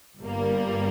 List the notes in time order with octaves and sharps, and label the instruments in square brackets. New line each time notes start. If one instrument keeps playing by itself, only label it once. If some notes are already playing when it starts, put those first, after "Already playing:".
[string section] G1 G2 G3 A#3